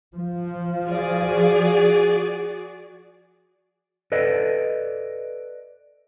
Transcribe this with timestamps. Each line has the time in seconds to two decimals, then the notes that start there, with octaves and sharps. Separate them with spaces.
0.15 F3
0.86 F#4 G#4 D5
4.12 A4 B4 D5 D#5